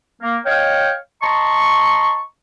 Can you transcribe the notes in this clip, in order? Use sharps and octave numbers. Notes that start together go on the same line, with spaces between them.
A#3
C#5 D#5 F5 G5
D#5 A5 A#5 C6 C#6